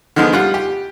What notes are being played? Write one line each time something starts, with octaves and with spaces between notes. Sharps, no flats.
D3 D#3 F3 G#3 B3
G3 F4 F#5
G4